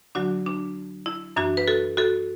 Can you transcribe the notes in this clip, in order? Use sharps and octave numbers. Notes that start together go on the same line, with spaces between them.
D2 D3 F#3 D4 F#4
D4
E4
F#2 E3 D4 F#4
B4
F#4 A4
F#4 A4